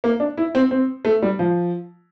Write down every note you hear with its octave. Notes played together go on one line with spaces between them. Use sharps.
A#3
D4
E4
C4
C4
A3
G3
F3